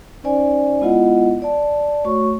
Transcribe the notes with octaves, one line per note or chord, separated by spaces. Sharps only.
C#4 D#4 C5 D5 G#5
G#3 B3 E4 F4 D#5 F#5
D5 A5
A3 F#4 C#5 C#6